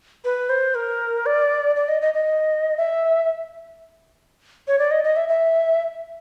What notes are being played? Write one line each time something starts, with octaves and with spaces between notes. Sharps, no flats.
B4
C5
A#4
D5
D5
D#5
D#5
D#5
E5
C#5
D5
D#5
D#5
E5
E5